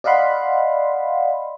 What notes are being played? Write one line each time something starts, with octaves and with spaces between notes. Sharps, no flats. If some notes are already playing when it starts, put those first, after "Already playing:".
D5 D#5 F5 F#5 B5 C6